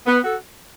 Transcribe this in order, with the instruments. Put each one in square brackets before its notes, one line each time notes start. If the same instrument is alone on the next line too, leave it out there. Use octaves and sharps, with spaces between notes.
[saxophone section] B3
F#4 A4